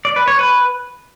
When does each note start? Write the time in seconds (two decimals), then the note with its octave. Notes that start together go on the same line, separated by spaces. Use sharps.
0.05 D5
0.16 B4
0.28 C#5
0.39 B4